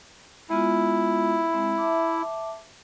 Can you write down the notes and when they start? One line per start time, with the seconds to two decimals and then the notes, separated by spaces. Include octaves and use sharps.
0.50 G#3 B3 E4 F4
1.53 G#3 C4
1.78 E5 A5 D6